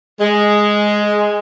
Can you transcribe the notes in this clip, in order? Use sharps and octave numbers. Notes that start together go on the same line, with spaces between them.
G#3